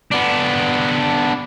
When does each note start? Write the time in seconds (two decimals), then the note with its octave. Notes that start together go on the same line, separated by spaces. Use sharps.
0.11 B3 D4